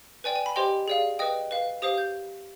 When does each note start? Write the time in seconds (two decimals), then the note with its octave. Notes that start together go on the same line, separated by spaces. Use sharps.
0.24 B4 D5 G5 G#5
0.36 G#5
0.46 B5
0.56 G4 C5 D#5 G5 C6
0.88 G#4 D5 F5
1.19 B4 D#5 G5 D#6
1.51 B4 F5
1.82 G4 C5 F5 D#6
1.98 G6